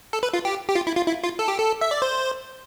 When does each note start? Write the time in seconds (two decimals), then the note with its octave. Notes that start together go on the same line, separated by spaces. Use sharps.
0.13 A4
0.23 B4
0.34 F4
0.45 G4
0.68 G4
0.75 F4
0.87 E4
0.96 F4
1.07 E4
1.24 F4
1.39 A4
1.48 G4
1.59 A4
1.81 E5
1.91 D5
2.02 C5